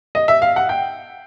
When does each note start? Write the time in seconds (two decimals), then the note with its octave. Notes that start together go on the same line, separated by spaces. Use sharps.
0.15 D#5
0.28 E5
0.42 F5
0.56 F#5
0.69 G5